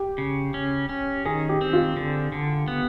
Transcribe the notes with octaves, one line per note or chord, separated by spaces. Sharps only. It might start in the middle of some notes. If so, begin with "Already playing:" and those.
Already playing: G4
C#3
C#4
C#4
D#3 G#4
G4
C4
F4
D3
D3
B3